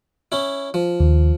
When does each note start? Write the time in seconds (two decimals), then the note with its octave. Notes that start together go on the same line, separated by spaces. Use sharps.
0.32 C#4 E4
0.74 F3
1.00 D#2